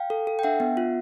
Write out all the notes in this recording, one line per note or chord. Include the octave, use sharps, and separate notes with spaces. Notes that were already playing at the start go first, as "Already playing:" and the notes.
Already playing: F5 G5
A4
A4
G5
D4 E5 F#5
B3
F4